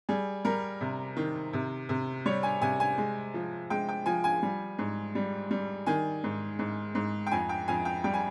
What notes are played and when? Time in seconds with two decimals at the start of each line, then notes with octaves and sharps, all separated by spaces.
0.09 G3 G#4
0.45 G3 A#4
0.81 C3
1.17 D#3
1.53 C3
1.89 C3
2.26 G3 C#5
2.43 G#5
2.61 C3 G#5
2.80 G#5
2.98 G#3
3.34 F3
3.70 G#3 G5
3.89 G5
4.06 F3 G#5
4.24 G#5
4.43 G3
4.79 G#2
5.15 G3
5.51 G3
5.86 D#3 G#5
6.24 G#2
6.59 G#2
6.95 G#2
7.27 G5
7.31 F2 G#5
7.49 G5
7.68 F2 G#5
7.85 G5
8.04 G3 G5
8.14 G#5